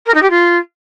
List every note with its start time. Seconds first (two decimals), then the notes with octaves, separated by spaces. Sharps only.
0.06 A#4
0.14 D#4
0.22 G4
0.30 F4